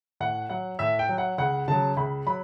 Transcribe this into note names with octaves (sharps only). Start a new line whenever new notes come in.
A2 F#5
F#3 F#5
A2 E5
G5
F#3
F#5
C#2 F#5
C#3 F#3 A5
C#2 B5
F#3 B5